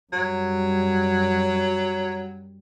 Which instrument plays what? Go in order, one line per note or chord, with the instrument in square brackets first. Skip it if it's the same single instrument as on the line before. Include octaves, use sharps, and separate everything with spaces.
[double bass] F#2 G3 [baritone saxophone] F#3